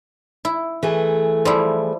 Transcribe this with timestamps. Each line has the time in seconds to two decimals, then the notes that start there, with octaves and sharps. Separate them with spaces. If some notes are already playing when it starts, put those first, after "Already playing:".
0.45 E4
0.83 E3 A3 G#4
1.45 F3 G3 E4